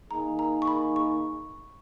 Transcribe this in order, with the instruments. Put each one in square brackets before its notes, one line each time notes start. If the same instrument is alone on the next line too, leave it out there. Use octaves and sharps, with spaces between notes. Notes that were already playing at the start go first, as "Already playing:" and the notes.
[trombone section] D#3 A#3 D#4 G#4 [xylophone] A#5
[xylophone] A#5
C#6
B5
C#6